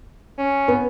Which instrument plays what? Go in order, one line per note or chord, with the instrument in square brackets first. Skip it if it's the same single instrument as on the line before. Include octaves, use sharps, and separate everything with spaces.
[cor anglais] C#4
[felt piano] B3